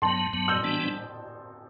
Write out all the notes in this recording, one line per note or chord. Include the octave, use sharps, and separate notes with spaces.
G2 F#3 B3 A5 C6
G2 F#3 B3
E6 G6
E3 G3 B3 D4